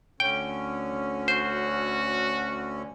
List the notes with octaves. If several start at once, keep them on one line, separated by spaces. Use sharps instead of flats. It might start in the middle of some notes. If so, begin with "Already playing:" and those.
D2 D3 C#4 G5
F#4 C5